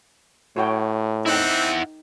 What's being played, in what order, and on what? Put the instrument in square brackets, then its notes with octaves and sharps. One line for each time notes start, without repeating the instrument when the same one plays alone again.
[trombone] A2 [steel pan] F#4 C#5 G5
[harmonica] C4 [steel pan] D#4 G5 [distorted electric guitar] E4 F#5